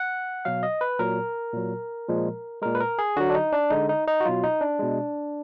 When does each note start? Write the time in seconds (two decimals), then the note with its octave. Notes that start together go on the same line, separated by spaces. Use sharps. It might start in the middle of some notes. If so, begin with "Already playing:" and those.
Already playing: F#5
0.45 B2 F#3 F5
0.63 D#5
0.81 B4
0.99 A#2 F#3 A#4
1.53 A#2 F#3
2.08 A#2 F3 G#3
2.62 A#2 G#3 A#4
2.75 B4
2.80 A#4
2.99 G#4
3.16 D3 F#3 F#4
3.30 D4
3.35 D#4
3.53 D4
3.70 D3 G#3 D#4
3.89 D#4
4.08 D#4
4.21 F#4
4.25 B2 F#3 F4
4.43 D#4
4.61 D4
4.79 B2 G#3